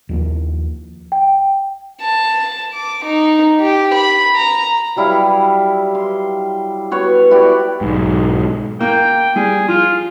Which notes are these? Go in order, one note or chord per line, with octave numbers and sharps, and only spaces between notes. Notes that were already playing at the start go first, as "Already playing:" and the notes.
D#2 F3 A#3
G5
A5
D6
D#4
G4
B5
A#5
F#3 G3 E4 F5
C6
B3 F#4 C#5
E4 F#4 G4 D5
B1 G#2
A#3 G5
G3 G#4
F3 F4